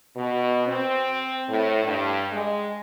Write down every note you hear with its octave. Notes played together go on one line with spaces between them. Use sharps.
B2
C4
A2
G2
G#3